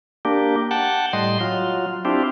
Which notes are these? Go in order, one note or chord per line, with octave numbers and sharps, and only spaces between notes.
A#3 D4 G4
F#5 G5 A5
A2 G3 D#5 C6
F#3 F4
C4 D4 E4 F4 G4